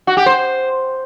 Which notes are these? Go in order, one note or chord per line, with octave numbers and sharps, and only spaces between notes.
F#4
G4
C5